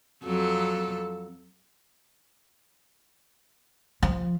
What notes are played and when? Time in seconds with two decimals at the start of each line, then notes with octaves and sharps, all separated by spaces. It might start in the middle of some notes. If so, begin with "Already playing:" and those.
0.24 F2 F#3 A4
4.02 F3